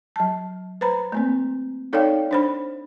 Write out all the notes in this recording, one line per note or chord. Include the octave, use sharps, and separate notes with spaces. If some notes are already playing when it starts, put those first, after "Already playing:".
F#3 A5
B4 C5 A#5 B5
A3 A#3 C4
D#4 A4 C#5 D5 F5 G5
D4 C5 B5